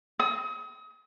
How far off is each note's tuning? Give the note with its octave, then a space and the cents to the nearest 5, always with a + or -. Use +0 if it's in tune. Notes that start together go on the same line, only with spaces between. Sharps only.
D#6 +35